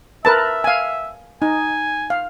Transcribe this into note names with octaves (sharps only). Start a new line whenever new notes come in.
A#4 B4 E5 A5
F5 G#5
D#4 G#5
F5